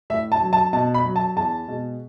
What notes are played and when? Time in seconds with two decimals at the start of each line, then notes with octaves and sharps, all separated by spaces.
0.10 A2 E5
0.32 A5
0.41 F#3
0.53 A5
0.73 B2 A5
0.94 B5
1.05 F#3
1.16 A5
1.36 E2 A5
1.68 B2 G#3